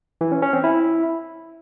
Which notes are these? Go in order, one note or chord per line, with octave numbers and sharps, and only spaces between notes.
E3
C#4
C#4
C4
E4